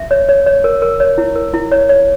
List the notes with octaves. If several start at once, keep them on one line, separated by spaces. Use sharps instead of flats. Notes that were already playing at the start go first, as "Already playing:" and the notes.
Already playing: E5
C#5
C#5
C#5
A#4
A#4
C#5
E4
A#4
E4
C#5
C#5